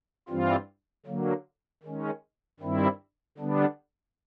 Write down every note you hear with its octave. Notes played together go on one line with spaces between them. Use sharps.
G2 E3 G3 C4 F4
D3 F#3 A#3
D#3 G#3 C#4
G2 D#3 G3 C4 E4
D3 G3 B3 D4